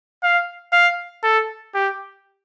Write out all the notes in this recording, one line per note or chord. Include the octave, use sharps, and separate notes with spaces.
F5
F5
A4
G4